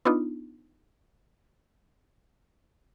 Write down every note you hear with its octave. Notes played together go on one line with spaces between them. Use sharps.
B3 D4 D#4 F4